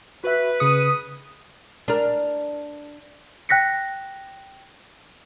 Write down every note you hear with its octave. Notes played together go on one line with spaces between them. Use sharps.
F#4 B4 E5
C#3 G#4 D#6 C#7
D4 A#4
G5 F#6 A#6 B6 C#7